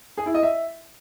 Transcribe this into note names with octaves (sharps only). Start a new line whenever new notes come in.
G#4
E4
D#5
E5